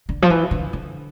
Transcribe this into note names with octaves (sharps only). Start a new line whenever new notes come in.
D3
F3
E3
D3
D3